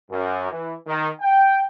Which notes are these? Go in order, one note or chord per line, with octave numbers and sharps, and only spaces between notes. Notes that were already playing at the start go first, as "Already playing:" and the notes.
F#2
E3
D#3
G5